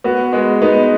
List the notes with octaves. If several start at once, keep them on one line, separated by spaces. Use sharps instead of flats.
B3 F#4
G#3 B3
B3 D#4